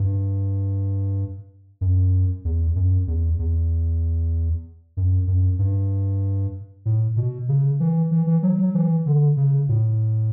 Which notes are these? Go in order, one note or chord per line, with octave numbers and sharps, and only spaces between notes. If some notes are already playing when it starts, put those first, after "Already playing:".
Already playing: G2
F#2
E2
F#2
E2
E2
F#2
F#2
G2
A2
B2
C#3
E3
E3
E3
F#3
F#3
E3
D3
C#3
A2